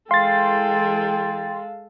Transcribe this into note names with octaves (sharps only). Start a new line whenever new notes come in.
E3 G#3 A4 F5 G5 C6 A6